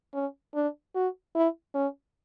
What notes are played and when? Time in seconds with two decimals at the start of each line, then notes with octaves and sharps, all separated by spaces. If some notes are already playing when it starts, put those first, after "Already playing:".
0.14 C#4
0.55 D4
0.95 F#4
1.35 E4
1.74 C#4